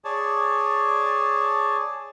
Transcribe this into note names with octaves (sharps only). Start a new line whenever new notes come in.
G#4 C#5 D5 A5